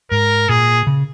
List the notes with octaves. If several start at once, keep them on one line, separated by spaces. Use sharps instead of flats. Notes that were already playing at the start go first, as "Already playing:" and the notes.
G#2 A#4
A#2 G#4
C#3